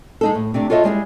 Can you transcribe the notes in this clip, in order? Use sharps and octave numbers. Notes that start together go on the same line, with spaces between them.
G#3 D#4 A4
A2
C3 A3 D4
F4 F#4 A4 C#5 D#5 E5
G3 G#3 E4 G#4